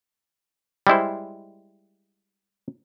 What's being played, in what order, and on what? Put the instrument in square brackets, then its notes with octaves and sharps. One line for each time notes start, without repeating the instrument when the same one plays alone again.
[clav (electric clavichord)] G3 G#3 E4 C5